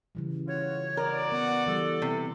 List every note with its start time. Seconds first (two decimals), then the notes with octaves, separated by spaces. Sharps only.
0.15 C#3 E3 G3
0.48 F4 F#4 C#5
0.97 F#4 A#4 D5
1.32 B3 F#5
1.67 E3 G3 A4
2.02 C3